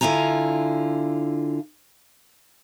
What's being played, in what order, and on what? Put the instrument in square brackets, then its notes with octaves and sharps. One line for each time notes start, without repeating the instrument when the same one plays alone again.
[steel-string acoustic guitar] D3 E4 F4 G#5 A#5